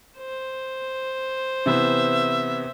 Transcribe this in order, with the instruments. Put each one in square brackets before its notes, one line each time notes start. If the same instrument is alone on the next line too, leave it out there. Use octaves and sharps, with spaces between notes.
[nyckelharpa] C5
[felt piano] C3 E3 B3 [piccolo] E5